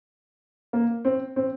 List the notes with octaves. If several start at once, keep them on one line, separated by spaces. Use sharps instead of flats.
A#3
C4
C4